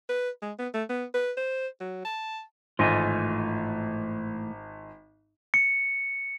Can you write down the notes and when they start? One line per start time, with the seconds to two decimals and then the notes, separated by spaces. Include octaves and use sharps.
0.09 B4
0.42 G#3
0.59 B3
0.74 A3
0.89 B3
1.14 B4
1.37 C5
1.80 F#3
2.05 A5
2.79 G#1 A2 E3 A3 F4 D#5 G#5
5.54 C#7